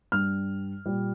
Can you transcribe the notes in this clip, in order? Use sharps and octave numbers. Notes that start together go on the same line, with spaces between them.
G2 G3 F6
A#2 G3